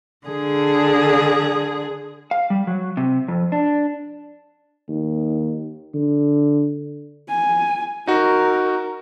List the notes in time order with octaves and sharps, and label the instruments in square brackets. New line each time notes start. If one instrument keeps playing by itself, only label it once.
[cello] D3 G#4
[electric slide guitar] F5
G3
F#3
C3
F2
D4
[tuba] D#2
D3
[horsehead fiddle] G#5
[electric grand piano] D#4 F#4 [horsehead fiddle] A#4